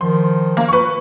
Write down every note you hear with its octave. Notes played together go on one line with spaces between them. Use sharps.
D#3 F3 C6
A#3
B4 C#6